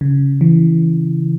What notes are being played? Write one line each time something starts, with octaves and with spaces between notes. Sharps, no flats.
C#3
E3